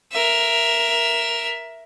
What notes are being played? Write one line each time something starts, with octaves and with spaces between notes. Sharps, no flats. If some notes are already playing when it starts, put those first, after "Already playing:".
A#4 E5